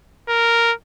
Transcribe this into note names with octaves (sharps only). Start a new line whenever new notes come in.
A#4